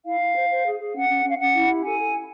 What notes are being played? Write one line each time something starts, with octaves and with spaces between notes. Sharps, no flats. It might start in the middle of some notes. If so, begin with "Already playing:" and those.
E4 F5
E4
C5
C5
G#4
G#4
C#4 F#5
C#4
C#4 F5
C#4 F#5
E4
G4
A4 G#5
A4
E4